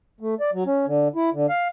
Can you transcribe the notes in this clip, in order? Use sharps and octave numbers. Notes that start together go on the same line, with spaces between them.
A3
D5
F#3
C#4
D3
E4
D3
F5